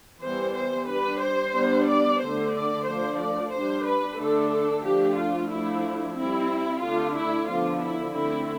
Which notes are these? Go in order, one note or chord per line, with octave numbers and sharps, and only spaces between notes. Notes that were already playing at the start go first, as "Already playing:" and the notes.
E3 G3 B3 C5
C5
G3 D4 B4
C5
G3 B3 D4
D5
D3 A3 D4 C5
D5
F3 A3 D4 C5
D5
G3 D4 C5
B4
D3 A3 D4 A4
A4
F3 A3 D4 G4
F4
F3 A3 D4 E4
G3 C4 E4
D3 A3 D4 F4
E4
D3 F3 B3 D4 F4
E4
D3 A3 C4 E4